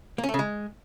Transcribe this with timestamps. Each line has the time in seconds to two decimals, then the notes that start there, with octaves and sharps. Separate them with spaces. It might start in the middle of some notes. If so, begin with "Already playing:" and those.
0.18 A#3
0.23 C#4
0.29 A3
0.34 C#3
0.39 G#3